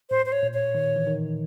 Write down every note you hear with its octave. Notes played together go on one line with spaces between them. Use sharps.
A2 C5
C5
C#5
A#2
C#5
D#3
E3
D#3